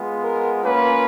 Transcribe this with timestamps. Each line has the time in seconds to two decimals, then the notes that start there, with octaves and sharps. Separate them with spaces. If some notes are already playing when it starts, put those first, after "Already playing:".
Already playing: G#3 B3 F4
0.23 A#4
0.63 A#3 C#4 F4 B4